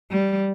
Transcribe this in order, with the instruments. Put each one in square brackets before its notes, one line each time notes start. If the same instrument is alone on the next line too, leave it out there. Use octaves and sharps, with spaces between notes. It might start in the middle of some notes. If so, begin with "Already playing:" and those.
[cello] G3